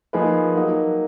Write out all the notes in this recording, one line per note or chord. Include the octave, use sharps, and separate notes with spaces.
F3 A#3 D#4 G#4 B4
F#3 A#3 D#4